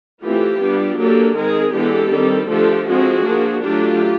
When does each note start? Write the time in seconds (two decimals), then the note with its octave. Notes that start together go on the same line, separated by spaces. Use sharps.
0.23 E3 A3 C4 F4 G4
0.61 G3 B3 D4
0.99 F#3 A#3 D4 G4 A4
1.36 D#3 G#3 C4 G#4 A#4
1.74 E3 G#3 B3 D4 G4 A4
2.12 D#3 G3 C4
2.50 D3 F3 A3 D4 G4 A4
2.87 F3 G#3 C4 F#4 G#4
3.25 F3 A#3 D4
3.62 F#3 A3 D4 F4 G4